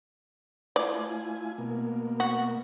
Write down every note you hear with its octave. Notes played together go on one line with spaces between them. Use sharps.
A3 E4 F4 D5 G#5
B2 A#3
F#4